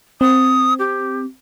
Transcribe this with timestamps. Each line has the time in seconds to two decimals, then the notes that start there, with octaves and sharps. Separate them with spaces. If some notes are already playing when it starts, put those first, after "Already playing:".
0.21 C4 D#6
0.79 G4